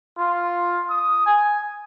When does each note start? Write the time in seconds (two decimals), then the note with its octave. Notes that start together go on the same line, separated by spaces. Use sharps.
0.17 F4
0.88 D#6
1.26 G#5